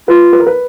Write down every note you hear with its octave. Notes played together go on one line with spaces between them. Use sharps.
F4 B4
B4
A#4
B4